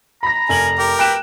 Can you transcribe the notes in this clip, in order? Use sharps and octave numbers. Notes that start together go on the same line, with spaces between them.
A#5 B5 A#6
F1 A#4 G#5 F#7
G4 A#4
B4 G5 F#6 E7